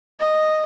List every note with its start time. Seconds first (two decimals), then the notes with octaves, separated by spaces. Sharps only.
0.20 D#5